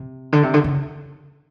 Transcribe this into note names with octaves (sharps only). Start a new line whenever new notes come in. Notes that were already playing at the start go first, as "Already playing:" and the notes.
Already playing: C3
D3
C3
D3
C#3